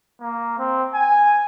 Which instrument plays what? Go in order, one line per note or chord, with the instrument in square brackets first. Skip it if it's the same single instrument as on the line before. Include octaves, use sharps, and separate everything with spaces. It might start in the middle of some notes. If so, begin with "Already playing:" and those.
[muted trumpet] A#3
C4
G#5